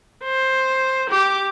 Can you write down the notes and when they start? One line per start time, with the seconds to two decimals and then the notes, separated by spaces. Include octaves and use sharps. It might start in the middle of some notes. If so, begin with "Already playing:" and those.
0.23 C5
1.10 G4 D6